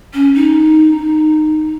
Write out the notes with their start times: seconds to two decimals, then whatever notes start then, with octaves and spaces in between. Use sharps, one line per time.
0.14 C#4
0.35 D#4